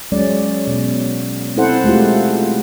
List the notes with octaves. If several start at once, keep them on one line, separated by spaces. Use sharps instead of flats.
F#3 G#3 C#4 D5
B2
C4 E4 A4 C5 F#5
G#3 A3 F4 G4